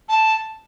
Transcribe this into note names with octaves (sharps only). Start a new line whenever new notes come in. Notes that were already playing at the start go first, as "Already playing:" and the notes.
A5